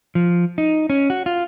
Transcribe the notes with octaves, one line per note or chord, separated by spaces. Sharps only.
F3
D#4
C#4
F#4
F4